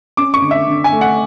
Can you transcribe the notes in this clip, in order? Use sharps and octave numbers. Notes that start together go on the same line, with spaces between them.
C#4 D6
C#6
D3
E5
D3
G#5
A3
F#5